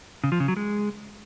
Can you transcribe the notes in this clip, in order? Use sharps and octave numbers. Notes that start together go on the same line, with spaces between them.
C#3
F3
C#3
F#3
G#3